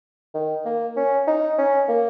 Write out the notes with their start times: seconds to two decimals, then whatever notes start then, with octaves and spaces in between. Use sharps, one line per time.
0.34 D#3
0.65 A#3
0.96 C#4
1.27 D#4
1.58 C#4
1.89 A#3